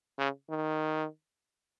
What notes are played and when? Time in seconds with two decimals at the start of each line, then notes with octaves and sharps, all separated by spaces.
0.19 C#3
0.50 D#3